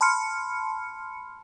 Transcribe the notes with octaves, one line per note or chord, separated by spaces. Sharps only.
A5 B5 C6 F6 C#7